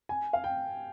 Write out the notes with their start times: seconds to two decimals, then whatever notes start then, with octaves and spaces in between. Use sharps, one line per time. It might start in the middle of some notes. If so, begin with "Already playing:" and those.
0.09 G#5
0.33 F5
0.44 G5